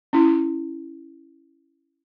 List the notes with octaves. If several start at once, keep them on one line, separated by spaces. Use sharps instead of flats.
C#4 E4